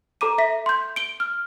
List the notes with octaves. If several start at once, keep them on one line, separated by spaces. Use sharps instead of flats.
A4 A#5 D6 D#7
E5 B6
C6 G6
D7 G7
F6